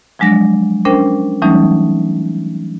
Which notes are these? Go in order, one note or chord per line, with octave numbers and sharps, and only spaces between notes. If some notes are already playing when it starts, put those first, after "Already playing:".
F3 F#3 G#3 D4 A#6
C#4 D4 A#4 C5 G5
E3 F#3 G3 A3 C#4 D#4